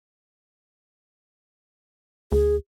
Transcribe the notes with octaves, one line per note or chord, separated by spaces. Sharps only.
D2 G#4